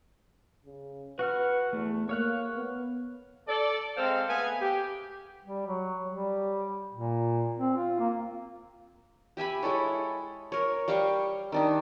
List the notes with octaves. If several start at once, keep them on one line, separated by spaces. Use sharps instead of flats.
C#3
F#4 B4 F#5 F6
E2 A3
A#3 C#5 F5 F#6
B3
A4 D5
G#3 C4 A4 C5 D#5 F5
A3 B3 G#4 B4 F5 G#5
G4
G3
F#3
G3
A#2
C4
F4
A#3
G4 E5 G#5 B5
G#3 E4 A4 C#5
A#4 C#5
G3 F5 G5 C#6
D#3 D4 D#4